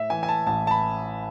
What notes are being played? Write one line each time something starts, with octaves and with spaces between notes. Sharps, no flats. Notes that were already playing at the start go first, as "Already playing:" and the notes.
Already playing: A2 E5
E3 G#5
G#5
A5
A1 A5
A5
B5